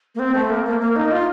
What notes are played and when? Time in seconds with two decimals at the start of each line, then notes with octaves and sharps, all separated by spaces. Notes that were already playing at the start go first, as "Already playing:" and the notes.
0.15 A#3
0.19 C4
0.35 A3
0.50 A#3
0.65 A#3
0.81 A#3
0.96 D#4
1.11 F4